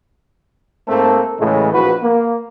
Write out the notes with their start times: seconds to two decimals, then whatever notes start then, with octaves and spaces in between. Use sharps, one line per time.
0.88 G#2 A3 A#3 C4 A4
1.40 A2 C#3 E3 G#3 A3
1.74 A#1 F#4 B4
2.02 A#3